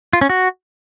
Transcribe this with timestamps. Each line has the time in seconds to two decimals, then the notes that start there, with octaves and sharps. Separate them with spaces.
0.13 F4
0.21 C#4
0.29 F#4